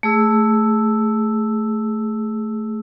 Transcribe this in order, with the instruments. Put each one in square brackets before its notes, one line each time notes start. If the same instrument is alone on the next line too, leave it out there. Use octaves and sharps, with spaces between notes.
[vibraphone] A3 G#4 E6